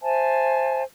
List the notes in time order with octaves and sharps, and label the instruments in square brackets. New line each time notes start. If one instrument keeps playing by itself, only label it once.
[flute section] C5 E5 G#5 A5